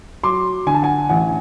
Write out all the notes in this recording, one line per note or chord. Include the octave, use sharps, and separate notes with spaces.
F#3 C6 D6
D3 G#5
A5
F#5 G#5
A1 F#5 G#5